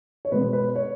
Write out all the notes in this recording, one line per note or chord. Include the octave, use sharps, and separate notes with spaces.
C#5
B2 G#3 B3 B4
B4
C#5